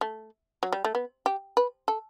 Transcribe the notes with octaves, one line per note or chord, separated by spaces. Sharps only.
A3
F#3
G3
A3
B3
G4
B4
A4